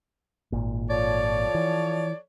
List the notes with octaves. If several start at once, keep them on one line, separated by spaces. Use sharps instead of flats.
G#1 A#2
F3 A4 C#5 D5
E3